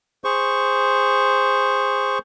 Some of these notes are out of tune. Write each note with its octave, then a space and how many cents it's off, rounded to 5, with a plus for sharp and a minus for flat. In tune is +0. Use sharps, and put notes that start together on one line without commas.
G#4 -15 C5 +0 C#6 +0